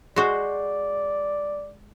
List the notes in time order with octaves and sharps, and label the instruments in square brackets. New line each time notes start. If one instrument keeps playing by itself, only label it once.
[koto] G#3 F#4 C5 [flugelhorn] D5